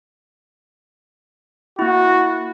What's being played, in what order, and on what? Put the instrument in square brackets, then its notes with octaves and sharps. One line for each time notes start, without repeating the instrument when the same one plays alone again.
[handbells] A#3 E4 [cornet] F#4